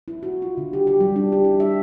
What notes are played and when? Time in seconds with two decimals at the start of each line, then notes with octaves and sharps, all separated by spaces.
0.08 E4
0.23 F#4
0.42 F4
0.58 D3
0.73 G4
0.87 G4
1.00 G3
1.16 D4
1.32 G4
1.45 E4
1.60 E5